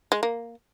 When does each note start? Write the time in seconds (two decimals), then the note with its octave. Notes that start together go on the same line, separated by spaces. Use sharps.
0.12 G#3
0.23 A#3